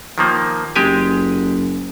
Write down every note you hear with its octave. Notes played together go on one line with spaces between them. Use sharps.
D#3 F3 A#3
F#1 G#3 G4 G#5